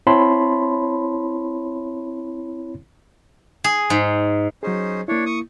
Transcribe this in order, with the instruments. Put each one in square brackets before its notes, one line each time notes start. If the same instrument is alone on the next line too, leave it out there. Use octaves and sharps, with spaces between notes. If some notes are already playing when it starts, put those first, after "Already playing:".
[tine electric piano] C4 E4 C#5 A5 B5 C6
[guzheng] G#4
G#2
[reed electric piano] F#3 G#4 [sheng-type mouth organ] C#4 D#4 C5
[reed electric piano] A#3 E4 [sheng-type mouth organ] D4 C#5
[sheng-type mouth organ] C#6 D#6